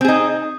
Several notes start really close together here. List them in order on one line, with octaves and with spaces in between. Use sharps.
C4 G#4 D#4